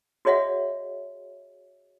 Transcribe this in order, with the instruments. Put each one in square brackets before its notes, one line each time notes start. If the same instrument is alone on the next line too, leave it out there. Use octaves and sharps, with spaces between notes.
[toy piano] F#4 G#4 C#5 D#5 E5 F#5